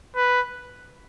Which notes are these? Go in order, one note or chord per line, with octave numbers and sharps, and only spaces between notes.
B4